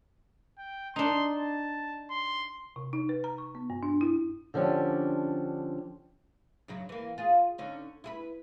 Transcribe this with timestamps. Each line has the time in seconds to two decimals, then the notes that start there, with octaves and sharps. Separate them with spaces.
0.59 G5
0.96 D4 D#4 C6
1.34 A5
2.10 C6
2.76 C3
2.93 D#4
3.09 B4
3.24 A#5
3.38 C#6
3.55 B3
3.70 G2
3.83 D4
4.01 E4
4.54 D3 F3 C#4 D4 G4
6.68 F#2 C#3 F#3
6.89 E3 A#3
7.18 F4 G#4
7.58 D3 C#4 D#4
8.04 E4 G#4 B4